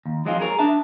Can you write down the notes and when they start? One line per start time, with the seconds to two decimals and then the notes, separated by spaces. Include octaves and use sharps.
0.06 D#2
0.25 F3 F#3 G#3 C4 D#4 F4
0.40 G#4 A#4 C#5
0.59 D4 E5 A5